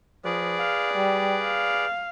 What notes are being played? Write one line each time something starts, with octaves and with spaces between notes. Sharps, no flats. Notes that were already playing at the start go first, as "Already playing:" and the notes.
F3 G#4 B4 D5
F5
G3
F5